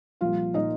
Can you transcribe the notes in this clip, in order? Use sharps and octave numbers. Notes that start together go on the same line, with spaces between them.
C2 A#2 F3 F4 F5
A#2 F3 D#4 D#5